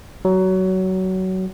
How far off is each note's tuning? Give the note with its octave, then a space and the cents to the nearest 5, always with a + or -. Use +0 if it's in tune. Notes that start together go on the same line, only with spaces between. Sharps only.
F#3 +20